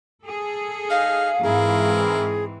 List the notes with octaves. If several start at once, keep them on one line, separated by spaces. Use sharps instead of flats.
G#4 A4
D#4 F5 F6
G#2 E3 C4 E4 G#4 A#4